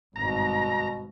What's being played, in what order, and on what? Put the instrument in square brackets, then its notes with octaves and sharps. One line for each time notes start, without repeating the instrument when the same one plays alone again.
[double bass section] G#1 G2 [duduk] B2 [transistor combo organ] A#5